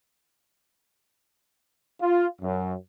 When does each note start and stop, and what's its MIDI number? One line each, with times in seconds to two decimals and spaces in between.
2.00 2.26 65
2.42 2.74 42